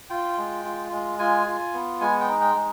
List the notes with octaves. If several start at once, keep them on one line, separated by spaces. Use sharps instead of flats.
F4 G5
G#3
F4
G#3
F4 G#5
F4
B3
G#3 G#5
G5
D#4
G5
G#3